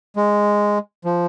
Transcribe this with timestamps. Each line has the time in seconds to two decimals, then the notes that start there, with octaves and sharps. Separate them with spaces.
0.16 G#3
1.05 F3